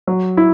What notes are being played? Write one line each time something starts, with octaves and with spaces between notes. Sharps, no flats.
F#3
E4